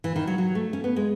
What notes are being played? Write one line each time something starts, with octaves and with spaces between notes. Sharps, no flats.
E3
D#3
F#3
F#3
A3
C#4
B3
G#3